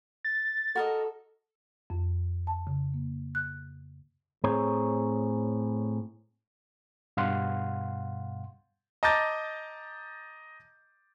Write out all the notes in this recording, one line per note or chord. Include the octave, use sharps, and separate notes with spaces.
A6
F#4 A4 A#4 D#5
F2
A5
C#3
A#3
F#6
A2 C4 G#4 C#5 A#5
G2 B2 F5 F#5 C6
D#5 A5 A#5 D6 G6 A6